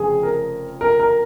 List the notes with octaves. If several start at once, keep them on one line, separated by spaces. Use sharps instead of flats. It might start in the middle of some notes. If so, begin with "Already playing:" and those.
Already playing: F1 F2 C#3 G#4
A#4
A#4
A#4